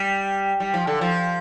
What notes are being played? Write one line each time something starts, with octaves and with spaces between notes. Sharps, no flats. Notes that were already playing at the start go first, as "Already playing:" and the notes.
Already playing: G3
G3
F3
D3
F3